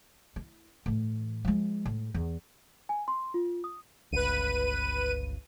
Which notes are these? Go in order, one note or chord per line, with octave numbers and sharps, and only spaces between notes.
E4
A2 E3
F3 G#3
A2
E2
G#5
C6
F4
D#6
G1 C#2 B4 D#7